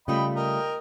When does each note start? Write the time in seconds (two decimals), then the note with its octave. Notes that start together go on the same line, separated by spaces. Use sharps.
0.08 C#3 G3 A3 F4 D#5 G5 B5
0.36 A#4 D#5 G5